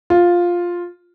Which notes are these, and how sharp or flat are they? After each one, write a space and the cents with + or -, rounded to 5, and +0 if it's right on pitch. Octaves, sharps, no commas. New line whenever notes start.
F4 +5